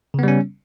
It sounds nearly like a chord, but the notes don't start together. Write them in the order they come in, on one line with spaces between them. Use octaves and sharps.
C#3 B3 G3 C#4